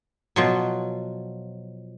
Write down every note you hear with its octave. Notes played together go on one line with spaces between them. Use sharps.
B2 F3 F#3